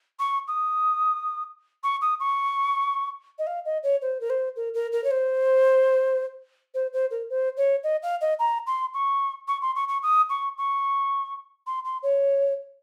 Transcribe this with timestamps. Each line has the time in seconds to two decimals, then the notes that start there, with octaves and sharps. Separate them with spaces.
0.19 C#6
0.47 D#6
1.83 C#6
2.01 D#6
2.19 C#6
3.38 D#5
3.46 F5
3.65 D#5
3.83 C#5
4.01 C5
4.20 A#4
4.29 C5
4.56 A#4
4.74 A#4
4.92 A#4
5.03 C#5
5.10 C5
6.74 C5
6.93 C5
7.10 A#4
7.29 C5
7.56 C#5
7.83 D#5
8.02 F5
8.21 D#5
8.39 A#5
8.66 C6
8.93 C#6
9.47 C#6
9.61 C6
9.75 C#6
9.88 C#6
10.02 D#6
10.29 C#6
10.57 C#6
11.66 C6
11.84 C6
12.02 C#5